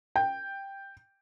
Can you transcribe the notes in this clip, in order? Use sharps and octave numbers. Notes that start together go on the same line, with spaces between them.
G5